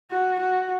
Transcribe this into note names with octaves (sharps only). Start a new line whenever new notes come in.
F#4
F#4